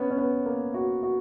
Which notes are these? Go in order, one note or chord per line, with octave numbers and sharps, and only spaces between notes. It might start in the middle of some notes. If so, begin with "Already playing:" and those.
Already playing: B3 C#4
C#4
B3
A#3
F#4
F#4